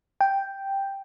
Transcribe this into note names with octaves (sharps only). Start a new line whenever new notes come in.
G5